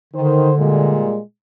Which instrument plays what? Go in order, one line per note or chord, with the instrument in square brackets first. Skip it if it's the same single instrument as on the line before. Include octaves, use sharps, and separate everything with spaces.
[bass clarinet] D3 [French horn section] D#3 C5
[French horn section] A#2 G3 G#3